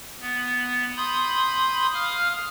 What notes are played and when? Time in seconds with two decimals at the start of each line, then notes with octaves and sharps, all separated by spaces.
0.21 B3
0.97 B5 C6 D#6 G6
1.94 F5 D#6 F6